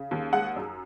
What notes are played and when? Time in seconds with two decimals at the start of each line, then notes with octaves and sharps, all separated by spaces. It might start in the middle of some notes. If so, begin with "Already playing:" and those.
Already playing: C#3
0.11 D#2
0.33 G#3 F#5
0.56 F#2